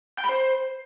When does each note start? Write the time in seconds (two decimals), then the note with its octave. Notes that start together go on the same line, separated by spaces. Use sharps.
0.18 G5
0.24 B5
0.29 C5